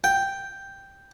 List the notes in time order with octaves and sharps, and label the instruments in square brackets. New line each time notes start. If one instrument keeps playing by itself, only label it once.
[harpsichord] G5